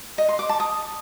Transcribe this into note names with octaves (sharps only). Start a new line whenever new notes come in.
D#5
C6
D6
A5
D#6